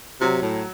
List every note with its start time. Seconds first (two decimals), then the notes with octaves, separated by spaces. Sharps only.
0.21 C3 F#3
0.42 A2